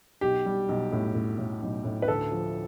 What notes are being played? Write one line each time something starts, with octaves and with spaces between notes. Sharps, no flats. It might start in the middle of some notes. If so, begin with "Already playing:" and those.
B1 G4
G3
B1
A2
A2
A2
B1
A2
B4
D2 A4
F3